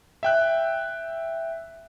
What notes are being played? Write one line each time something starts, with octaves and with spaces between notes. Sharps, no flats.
E5 G5 F#6